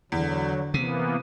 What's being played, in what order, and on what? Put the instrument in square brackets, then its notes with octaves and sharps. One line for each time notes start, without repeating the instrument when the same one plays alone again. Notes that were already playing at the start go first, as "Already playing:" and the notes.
[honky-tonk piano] E2 [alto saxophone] D3 [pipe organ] F#3
[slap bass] C3 [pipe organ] E3 A#3 B3 [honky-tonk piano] D#7